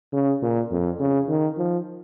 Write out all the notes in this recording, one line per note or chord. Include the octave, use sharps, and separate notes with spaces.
C#3
A#2
F2
C#3
D#3
F3